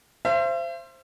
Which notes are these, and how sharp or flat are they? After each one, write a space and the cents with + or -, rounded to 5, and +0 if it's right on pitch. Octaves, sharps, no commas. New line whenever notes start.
C5 +5 E5 +45